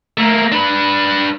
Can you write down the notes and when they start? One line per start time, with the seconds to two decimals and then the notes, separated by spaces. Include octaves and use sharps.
0.18 A3 A#3
0.52 D4 B4